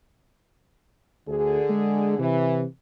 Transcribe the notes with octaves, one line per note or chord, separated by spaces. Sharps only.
D2 D3 G#4
G#3
C3 E3